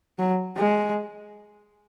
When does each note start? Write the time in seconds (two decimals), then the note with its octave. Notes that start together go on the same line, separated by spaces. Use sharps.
0.19 F#3
0.57 G#3